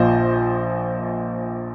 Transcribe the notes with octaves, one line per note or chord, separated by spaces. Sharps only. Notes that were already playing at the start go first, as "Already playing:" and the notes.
Already playing: A#1 A#2 F3 C5 D#5